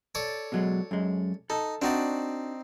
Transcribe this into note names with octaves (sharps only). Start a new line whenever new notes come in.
A4 C#5 D5
B2 F#3 G#3
F#2 G#3
D#4 A4
C4 D4 D#4 F#4 D5